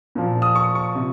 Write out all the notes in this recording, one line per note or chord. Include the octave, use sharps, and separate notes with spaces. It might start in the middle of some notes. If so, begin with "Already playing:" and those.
A#2 F3
D#6
C#6
C#6
C3